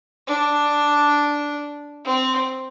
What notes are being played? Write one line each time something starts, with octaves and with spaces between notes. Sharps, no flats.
D4
C4